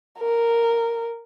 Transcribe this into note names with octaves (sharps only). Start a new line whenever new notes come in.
A#4